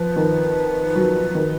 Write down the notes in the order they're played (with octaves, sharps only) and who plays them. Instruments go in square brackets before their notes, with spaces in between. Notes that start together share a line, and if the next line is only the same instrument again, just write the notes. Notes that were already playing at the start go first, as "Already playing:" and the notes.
Already playing: [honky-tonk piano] F3 [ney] B4
[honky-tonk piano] D#3
F#3
D#3